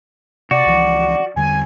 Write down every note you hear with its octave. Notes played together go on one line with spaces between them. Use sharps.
C3 F#4 D5
C#2 E3 F3
E2 D3 G3 G#5